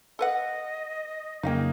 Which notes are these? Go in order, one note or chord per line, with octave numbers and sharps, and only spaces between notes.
A4 B4 D#5 F#5
F2 C#3 F#3 A#3 C#4 D#4 F5 G5